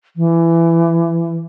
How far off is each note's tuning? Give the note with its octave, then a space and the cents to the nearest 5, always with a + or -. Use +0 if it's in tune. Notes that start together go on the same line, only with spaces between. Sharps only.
E3 +20